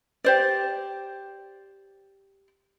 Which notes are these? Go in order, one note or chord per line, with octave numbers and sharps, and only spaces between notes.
G4 C5 D5